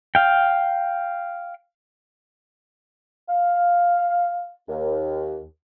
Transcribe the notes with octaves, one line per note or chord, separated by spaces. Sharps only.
F5 G5
F5
D#2